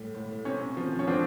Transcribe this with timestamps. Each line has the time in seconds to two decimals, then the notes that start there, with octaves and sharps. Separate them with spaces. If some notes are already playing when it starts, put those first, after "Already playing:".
Already playing: A2 G3
0.15 A2
0.45 C3 C#4
0.77 F3
0.99 C#4
1.07 F3 C4 D4